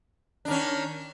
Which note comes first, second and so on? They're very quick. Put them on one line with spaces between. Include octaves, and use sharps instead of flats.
D4 D#3 C#4